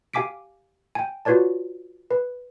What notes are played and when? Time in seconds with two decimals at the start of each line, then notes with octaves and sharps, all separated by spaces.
0.14 G4 F5 G#5 D6 B6 D7
0.95 G5 G#5
1.25 F4 F#4 B4 C#5 D5 A5
2.11 B4